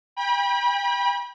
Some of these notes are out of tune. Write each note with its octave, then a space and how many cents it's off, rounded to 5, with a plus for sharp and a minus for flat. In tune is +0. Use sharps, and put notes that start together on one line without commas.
G5 +30 B5 -30